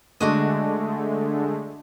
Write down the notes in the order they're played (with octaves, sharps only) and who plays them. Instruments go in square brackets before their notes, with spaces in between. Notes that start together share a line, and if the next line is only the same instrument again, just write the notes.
[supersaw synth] D3 G#3 A3 [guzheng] D4 F#4 D#5